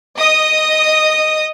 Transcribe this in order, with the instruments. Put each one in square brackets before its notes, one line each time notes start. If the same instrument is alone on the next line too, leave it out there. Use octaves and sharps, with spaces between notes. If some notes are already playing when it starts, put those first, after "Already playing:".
[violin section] D#5 D#6